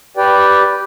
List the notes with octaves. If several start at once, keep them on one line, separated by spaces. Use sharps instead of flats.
G4 B4 D5 G5